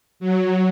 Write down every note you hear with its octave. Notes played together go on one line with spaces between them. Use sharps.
F#3